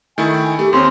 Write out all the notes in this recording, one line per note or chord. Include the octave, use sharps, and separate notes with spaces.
D#3 A3 E4 G#5
A3 G4
D#2 C4 C#4 C6